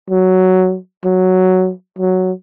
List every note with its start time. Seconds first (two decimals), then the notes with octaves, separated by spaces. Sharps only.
0.10 F#3
1.05 F#3
1.99 F#3